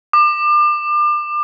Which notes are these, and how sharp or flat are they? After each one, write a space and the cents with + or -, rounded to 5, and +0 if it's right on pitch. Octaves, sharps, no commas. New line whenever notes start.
D6 +35